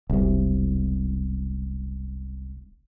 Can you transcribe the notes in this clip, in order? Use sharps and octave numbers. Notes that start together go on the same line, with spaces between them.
E1 C2 C3